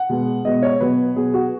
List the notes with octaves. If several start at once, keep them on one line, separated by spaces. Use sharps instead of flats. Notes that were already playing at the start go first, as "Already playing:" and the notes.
Already playing: F#5
B2 G#3 B3
B2 G#3 B3 D#5
C#5
B2 F#3 B3 B4
B2 F#3 B3 G#4
F#4